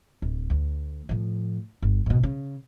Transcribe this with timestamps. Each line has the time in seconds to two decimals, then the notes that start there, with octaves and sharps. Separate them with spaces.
0.22 D1
0.50 D2
1.09 A2 F3
1.82 G1
2.06 G#2 B2
2.23 C#3